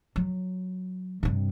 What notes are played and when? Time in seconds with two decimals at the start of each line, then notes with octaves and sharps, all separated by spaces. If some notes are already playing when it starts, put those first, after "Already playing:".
0.16 F#3
1.23 G2 C3